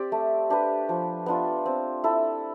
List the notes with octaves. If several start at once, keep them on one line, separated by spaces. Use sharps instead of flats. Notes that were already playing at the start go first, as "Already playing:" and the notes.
Already playing: C4 G4 D5
A3
D4 G4 B4
F3
B3 D4 F4
C4
E4 A4